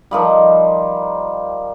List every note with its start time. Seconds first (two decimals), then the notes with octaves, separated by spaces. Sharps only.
0.11 D#3 F3 G3